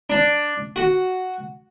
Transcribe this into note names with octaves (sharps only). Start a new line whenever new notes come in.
D4
F#4